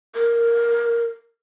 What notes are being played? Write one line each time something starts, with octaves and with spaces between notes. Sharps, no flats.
A#4